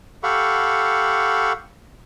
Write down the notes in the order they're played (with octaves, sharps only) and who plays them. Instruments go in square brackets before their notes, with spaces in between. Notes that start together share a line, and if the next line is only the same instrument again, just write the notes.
[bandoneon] G4 A4 F5 F#5 B5 C#6